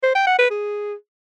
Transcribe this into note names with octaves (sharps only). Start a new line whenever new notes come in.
C5
G5
F#5
B4
G#4